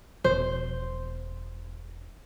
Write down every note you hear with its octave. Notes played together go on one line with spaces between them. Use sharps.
E1 B2 F3 C5